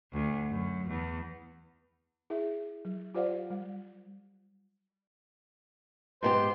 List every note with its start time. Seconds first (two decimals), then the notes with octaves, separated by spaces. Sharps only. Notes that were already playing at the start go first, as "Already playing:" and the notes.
0.12 D2
0.49 F#2
0.88 E2
2.30 E4 G#4 E5
2.85 F#3
3.15 F4 G4 C5 D5 F5 F#5
3.50 G3
6.23 G#2 B3 G4 C5 C6